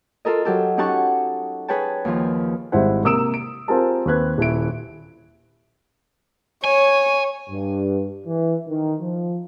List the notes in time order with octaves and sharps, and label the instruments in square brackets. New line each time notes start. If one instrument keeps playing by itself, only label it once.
[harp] F4 A4 A#4 D#5
F#3 G4 A4
C#4 D#4 G4 F#5 A5 C#6
G#4 B4 C#5 G5 A5
D#2 F3
[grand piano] G#1 G3 G#3 E4 C5 F#5
C3 A#3 D#6 E6 D7 E7
D7
C4 F4 G4 G#4 A#4 A5
D#2 C4 B4 F#6 G#6
D#1 E4 D7
[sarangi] C#5 [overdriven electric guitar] G#5
[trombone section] G2
E3
D#3
F3